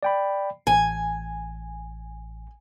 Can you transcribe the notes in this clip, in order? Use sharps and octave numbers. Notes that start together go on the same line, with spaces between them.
D5 G5 B5
A1 G#5